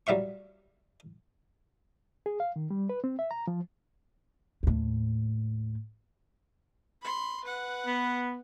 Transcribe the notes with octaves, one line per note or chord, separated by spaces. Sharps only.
F#3 G3 E5 F5 C#6
G#4
F5
D#3
G3
B4
C4
E5
A#5
F3
D#2 A2
B5 C6
B4 F#5
B3